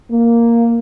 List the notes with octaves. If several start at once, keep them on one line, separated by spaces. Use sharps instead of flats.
A#3